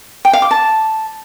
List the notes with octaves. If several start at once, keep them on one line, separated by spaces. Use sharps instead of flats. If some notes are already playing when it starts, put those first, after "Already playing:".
G5
F5
D6
A5